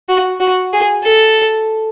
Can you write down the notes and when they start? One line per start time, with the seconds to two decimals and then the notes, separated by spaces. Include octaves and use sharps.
0.09 F#4
0.40 F#4
0.73 G#4
1.04 A4